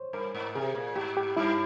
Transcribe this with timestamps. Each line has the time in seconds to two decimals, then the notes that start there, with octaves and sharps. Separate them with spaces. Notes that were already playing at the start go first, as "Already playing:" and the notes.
Already playing: C5 C#5
0.13 G2 A#4
0.34 G#2
0.55 C3 G#4
0.75 A#2
0.96 G#2 G4
1.17 G4
1.37 G2 E4